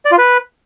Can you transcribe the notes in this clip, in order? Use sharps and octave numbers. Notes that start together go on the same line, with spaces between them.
D5
F4
B4